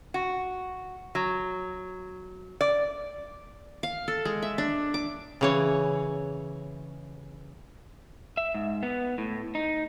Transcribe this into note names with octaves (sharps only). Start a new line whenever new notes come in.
F#4
F#3
D5
F5
A4
G#3
E5
D4
D6
C#3 E3 C#5
E5
G#2
B3
A2
D#4